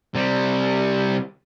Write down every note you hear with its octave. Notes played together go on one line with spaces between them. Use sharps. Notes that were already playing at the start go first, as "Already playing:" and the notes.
C3 G3